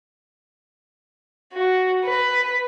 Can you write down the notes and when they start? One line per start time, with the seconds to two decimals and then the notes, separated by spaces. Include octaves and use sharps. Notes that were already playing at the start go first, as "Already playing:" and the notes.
1.53 F#4
2.04 B4